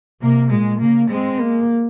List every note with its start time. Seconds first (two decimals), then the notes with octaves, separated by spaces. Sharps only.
0.21 C3 A#3
0.51 A#2 G#3
0.80 C#3 A#3
1.10 G#3 C4
1.40 A#3